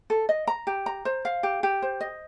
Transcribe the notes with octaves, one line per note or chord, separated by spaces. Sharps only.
A4
D#5
A#5
G4
A#5
C5
F5
G4
G4
C5
D#5